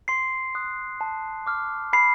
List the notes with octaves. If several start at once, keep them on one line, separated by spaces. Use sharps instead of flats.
C6 C7
D#6 F#6
A5
D6 F6
B5 C7